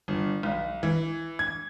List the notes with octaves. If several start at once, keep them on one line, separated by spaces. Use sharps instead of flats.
G1
B1
E3
G#6